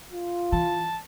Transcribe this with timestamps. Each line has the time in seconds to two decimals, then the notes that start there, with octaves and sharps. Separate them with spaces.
0.12 F4
0.52 E3 A5